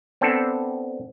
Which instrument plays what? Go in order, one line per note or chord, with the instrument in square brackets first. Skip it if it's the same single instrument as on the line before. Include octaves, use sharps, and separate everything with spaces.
[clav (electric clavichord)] B3 C4 D4 A4